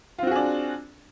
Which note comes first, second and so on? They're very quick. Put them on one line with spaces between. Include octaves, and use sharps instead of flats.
F4 C4 F#4 G#4 D4